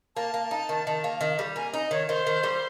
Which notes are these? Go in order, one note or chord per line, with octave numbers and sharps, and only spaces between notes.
A#3 A5
A#3
D#4
D#3
D#3
A#3
D#3
G3
A#3 G#5
D#4 D#5
D#3 C#5
D#3 C5
D#3
G3